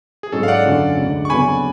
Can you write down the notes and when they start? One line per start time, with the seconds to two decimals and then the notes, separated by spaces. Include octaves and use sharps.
0.23 G#4
0.32 G#2 F#3 C#4 A4
0.43 F5
0.48 D5 F#5
0.65 F#2 D3 F#3 C#4
0.97 D2 D3 G#3 D4
1.25 C#6
1.30 F2 C#3 F#3 B3 D4 G#5 B5